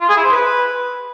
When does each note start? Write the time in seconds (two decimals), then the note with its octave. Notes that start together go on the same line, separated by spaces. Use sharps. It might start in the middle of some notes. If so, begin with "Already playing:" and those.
0.01 F4
0.09 G#4
0.17 E4
0.24 C5
0.32 B4